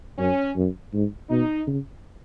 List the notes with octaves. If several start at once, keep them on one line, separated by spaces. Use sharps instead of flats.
F#2 C#4
F#2
G#2
B2 D#4
C#3